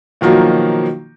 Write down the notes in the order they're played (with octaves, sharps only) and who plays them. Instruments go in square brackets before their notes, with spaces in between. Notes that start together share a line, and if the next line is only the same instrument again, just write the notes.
[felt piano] B2 D#3 F3 F#3 A#3